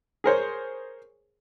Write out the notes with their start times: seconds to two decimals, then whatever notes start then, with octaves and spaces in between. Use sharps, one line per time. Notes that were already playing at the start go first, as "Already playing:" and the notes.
0.24 G#4 A#4 C5 C#5